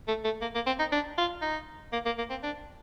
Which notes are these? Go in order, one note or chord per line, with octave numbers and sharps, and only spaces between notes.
A3
A3
A#3
A#3
C4
D#4
D4
F4
D#4
A#3
A#3
A#3
C4
D4